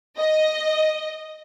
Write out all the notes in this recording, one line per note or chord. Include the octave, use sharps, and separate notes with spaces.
D#5